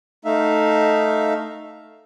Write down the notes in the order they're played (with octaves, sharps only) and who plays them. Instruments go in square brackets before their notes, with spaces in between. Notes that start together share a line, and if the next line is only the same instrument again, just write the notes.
[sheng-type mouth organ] A3 D#4 E5 F5